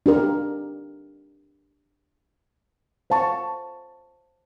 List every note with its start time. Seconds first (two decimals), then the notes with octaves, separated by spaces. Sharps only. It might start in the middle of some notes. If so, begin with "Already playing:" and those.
0.06 D4 G4 A#4
3.10 C5 F5 A5 C#6